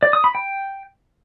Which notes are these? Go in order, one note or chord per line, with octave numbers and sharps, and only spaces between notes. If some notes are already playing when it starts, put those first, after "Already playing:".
D5
D#6
B5
G5